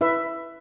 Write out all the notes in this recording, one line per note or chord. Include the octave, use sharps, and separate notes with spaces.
E4 B4 E5